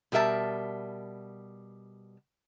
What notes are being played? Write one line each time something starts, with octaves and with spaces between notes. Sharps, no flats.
B2 G3 A#4 E5 A5